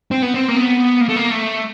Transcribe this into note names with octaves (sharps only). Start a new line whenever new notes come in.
C4
B3
C4
A#3
B3
A#3
A3
A#3
A3